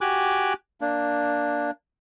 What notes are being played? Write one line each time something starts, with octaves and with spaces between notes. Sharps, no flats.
F#4 G4 G#5 D6 F#6
A#3 D4